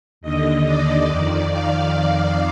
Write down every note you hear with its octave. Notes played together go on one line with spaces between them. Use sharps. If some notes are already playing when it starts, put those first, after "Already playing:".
D#2 D3 D#5
D5
F2 D#3
F5